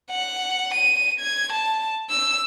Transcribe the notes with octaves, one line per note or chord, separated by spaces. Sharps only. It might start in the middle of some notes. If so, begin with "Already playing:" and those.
F#5
D#7
G#6
A5
E6